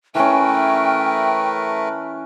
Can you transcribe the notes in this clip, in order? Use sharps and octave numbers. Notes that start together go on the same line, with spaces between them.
E3 A3 C#4 A#4 B4 G5